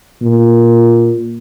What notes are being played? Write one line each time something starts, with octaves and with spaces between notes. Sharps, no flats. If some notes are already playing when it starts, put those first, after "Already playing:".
A#2